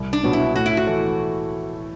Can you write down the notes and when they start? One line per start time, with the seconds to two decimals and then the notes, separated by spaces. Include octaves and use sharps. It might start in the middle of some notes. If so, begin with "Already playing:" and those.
Already playing: C2
0.13 D4
0.23 B2 F#3 B3 F#4
0.33 E4
0.55 A2 F#4
0.66 E4
0.77 F#4
0.87 E3 A3